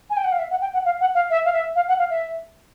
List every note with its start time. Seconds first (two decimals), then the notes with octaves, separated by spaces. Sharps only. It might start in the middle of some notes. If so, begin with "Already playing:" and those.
0.10 G#5
0.17 G5
0.24 F#5
0.32 F5
0.39 E5
0.50 F#5
0.61 G5
0.73 F#5
0.85 F5
1.00 F#5
1.15 F5
1.30 E5
1.45 F5
1.53 E5
1.76 F5
1.88 F#5
1.99 F5
2.10 E5